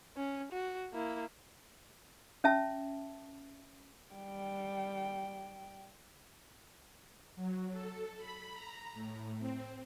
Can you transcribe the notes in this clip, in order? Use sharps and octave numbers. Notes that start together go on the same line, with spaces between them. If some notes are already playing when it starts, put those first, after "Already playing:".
C#4
F#4
A#3 E4
C#4 E5 A5
G3 G5
F#3
A4
B5
A#5
A2
C4